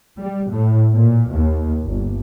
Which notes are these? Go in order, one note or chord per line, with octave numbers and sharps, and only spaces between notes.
G3
A2
A#2
D#2
G1